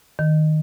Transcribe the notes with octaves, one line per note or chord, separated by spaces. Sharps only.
D#3